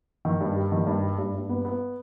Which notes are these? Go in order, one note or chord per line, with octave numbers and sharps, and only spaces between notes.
D#3
G2
G3
D#3
G2
G3
G2
G2
B3
B3